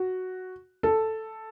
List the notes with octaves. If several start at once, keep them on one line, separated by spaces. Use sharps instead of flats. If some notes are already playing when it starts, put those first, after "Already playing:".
Already playing: F#4
A4